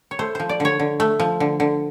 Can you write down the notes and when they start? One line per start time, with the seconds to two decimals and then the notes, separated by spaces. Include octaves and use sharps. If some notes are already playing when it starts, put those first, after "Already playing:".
0.11 C#5
0.19 A3 C5
0.35 F3 C5
0.49 D5
0.60 D3 C#5
0.79 D3
1.00 A3
1.20 F3
1.40 D3
1.60 D3